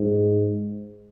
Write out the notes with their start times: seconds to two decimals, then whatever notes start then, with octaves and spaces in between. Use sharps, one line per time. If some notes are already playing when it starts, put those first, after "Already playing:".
Already playing: G#2